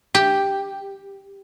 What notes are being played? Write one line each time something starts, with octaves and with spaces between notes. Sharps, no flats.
G4